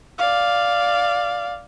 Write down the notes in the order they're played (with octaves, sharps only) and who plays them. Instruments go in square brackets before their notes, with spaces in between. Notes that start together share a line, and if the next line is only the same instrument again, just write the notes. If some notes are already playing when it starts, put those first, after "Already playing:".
[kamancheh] D5 F5